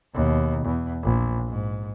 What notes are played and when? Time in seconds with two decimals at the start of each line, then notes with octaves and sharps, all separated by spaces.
0.14 D#2 B2
0.66 E2
1.03 A#1
1.48 G#2